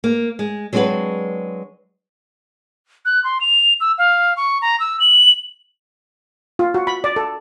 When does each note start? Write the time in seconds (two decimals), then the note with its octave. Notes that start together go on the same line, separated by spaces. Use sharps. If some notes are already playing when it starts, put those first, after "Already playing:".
0.04 A#3
0.39 G#3
0.73 F#3 G#3 C4 D4 F#4 B4
3.05 F#6
3.24 C6
3.41 F7
3.81 E6
3.98 F5
4.37 C#6
4.62 A#5
4.80 E6
5.00 F#7
6.59 F4
6.74 F#4
6.87 B5
7.04 D5
7.16 A4